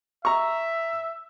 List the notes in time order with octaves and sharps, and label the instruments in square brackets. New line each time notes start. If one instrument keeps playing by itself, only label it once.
[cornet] E5 [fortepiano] A#5 C#6